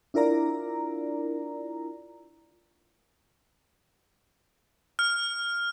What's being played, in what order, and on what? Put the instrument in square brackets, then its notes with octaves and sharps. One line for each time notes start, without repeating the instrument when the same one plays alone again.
[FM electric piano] D4 E4 F4 A#4 D5 A#5
[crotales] F6